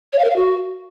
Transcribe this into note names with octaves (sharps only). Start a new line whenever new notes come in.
C#5
F5
A#4
F5
F#4